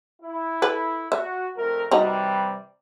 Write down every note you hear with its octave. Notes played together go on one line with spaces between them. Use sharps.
E4
A4 B4
F#4 E5
F2 A3 A#4
C3 E3 G3 D#4 F#4 A#5